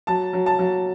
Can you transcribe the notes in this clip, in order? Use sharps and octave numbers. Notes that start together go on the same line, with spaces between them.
F#3 A5
F#3
A5
F#3